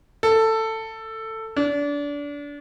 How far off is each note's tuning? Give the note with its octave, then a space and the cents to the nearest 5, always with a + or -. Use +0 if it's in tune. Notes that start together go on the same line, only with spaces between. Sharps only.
A4 +15
D4 -25